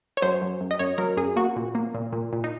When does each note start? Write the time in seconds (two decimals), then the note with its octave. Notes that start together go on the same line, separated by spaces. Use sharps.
0.17 C#5
0.22 F#2 C5
0.42 F#2
0.61 F#2
0.71 D#5
0.79 F#2 C#5
0.98 F#3 A#4
1.17 F#2 G#4
1.36 A#3 F#4
1.56 A#2
1.75 A#3
1.94 A#2
2.13 A#2
2.33 A#2
2.44 D#4